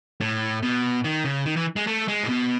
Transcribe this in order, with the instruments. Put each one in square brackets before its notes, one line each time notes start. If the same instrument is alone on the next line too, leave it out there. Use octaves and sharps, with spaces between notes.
[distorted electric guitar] A2
B2
D#3
C#3
D#3
E3
G#3
A3
G#3
A2
B2